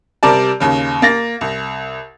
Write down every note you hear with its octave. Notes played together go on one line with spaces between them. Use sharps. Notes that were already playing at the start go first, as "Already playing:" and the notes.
C3 G3 A#4 D5 A5
D#2 C#3
A#3 A6 A#6
C2